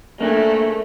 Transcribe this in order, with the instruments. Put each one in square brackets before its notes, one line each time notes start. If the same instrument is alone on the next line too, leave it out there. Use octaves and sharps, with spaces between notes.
[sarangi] A3 [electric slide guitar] A#3 D4 G#4